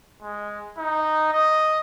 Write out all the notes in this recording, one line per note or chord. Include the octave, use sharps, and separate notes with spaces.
G#3
D#4
D#5